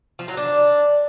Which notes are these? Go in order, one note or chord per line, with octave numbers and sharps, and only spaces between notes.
F3
F#3
D4